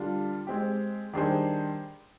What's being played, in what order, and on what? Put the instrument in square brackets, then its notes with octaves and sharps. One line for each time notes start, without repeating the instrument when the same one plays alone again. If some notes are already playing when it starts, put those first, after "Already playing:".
Already playing: [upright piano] D3 G3 D4 F4
G#3 C4 G4
D#3 G3 D4 G#4 C5